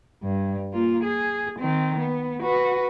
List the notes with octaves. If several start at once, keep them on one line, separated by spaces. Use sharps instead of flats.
G2
A#3 F4
G#4
D#3 C4
B3
F#4 B4